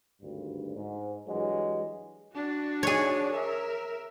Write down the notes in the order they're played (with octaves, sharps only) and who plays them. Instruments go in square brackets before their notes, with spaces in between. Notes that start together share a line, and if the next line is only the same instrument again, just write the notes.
[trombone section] G#1 D2 G2
G#2
G2 E3 F#3 G#3
[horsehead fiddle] D4 F#4
[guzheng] G#4 C#5
[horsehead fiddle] A#4 E5